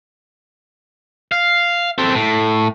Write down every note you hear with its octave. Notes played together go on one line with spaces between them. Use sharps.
F5
C4 A4
A2